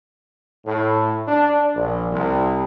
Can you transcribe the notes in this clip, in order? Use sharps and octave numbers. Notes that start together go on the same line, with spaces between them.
A2
D4
A#1
C2